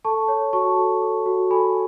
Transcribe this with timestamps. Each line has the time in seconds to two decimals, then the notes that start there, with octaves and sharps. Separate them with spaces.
0.05 A4 A5 C#6
0.28 C#5
0.53 F#4 A5 C#6
0.78 A4
1.02 A4
1.26 F#4
1.51 A4 G#5 B5